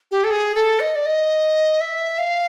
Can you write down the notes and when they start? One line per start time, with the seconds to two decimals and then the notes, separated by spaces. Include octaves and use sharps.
0.11 G4
0.24 A4
0.30 G#4
0.55 A4
0.80 D#5
0.95 D5
1.06 D#5
1.81 E5
2.19 F5